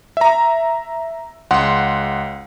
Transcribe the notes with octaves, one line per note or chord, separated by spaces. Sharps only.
E5 A#5
C#2 F#5 C6